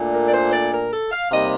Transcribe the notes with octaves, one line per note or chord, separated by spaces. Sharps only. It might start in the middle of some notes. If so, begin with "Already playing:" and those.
Already playing: A#2 A3 D4
A#4
D5
C5
D5
A#4
A4
F5
C3 G3 A#3 D#4 D#5